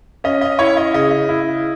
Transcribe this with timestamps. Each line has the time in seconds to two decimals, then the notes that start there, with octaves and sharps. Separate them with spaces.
0.24 C#4 D#5
0.41 D#5
0.59 E4 C#5
0.77 D#5
0.94 C#3 D#5
1.29 E4